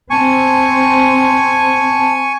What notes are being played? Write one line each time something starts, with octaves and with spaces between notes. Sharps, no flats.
C4 G#5 A5 C#6